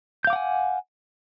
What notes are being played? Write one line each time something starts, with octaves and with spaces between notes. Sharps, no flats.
F5 F#5 G#5 D6 G6